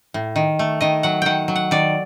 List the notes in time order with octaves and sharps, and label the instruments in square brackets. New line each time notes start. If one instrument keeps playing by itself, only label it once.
[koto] A2
D#3
A3
D#3 D#5
F#3 F#5
D#3 F#5 G5
F#3
F#5
D#3 D5